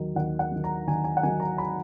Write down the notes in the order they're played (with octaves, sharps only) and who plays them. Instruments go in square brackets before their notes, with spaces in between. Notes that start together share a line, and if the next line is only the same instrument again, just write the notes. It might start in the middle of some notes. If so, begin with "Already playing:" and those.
Already playing: [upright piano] D#2 D#3 F#3
D#2 F#5
F#5
D#3 F#3
A#5
D#2 G#5
G#5
F#5
D#3 F#3 G#5
A#5
B5